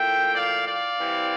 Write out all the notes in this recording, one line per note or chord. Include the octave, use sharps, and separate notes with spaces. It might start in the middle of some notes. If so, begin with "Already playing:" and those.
Already playing: A2 F3 A#3 E5 G5
D5 F5
D5 F5
E3 G3 C4 E4